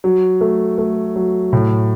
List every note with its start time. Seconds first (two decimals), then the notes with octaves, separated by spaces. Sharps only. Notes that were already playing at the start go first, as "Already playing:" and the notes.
0.04 F#3
0.41 A3
0.78 A3
1.16 F#3
1.53 A2